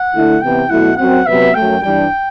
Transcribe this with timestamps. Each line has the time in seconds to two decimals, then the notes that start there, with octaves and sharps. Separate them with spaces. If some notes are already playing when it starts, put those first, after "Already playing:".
Already playing: F#5
0.13 D3 A3 E4
0.41 C3 E3 B3 G5
0.69 B2 F#3 A3 E4 F#5
0.97 F#2 F#3 C4 F#5
1.26 C3 F#3 B3 E5
1.54 F#2 F#3 A3 G5
1.82 G2 E3 G3 D4 G5